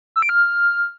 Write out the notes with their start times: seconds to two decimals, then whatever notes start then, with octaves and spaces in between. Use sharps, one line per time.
0.16 E6
0.22 D7
0.29 F6